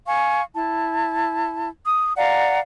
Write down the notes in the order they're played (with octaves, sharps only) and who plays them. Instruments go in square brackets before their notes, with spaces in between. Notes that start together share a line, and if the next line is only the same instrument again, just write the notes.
[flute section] F5 G#5 C#6
E4 A5
D#6
D5 F5 F#5 A#5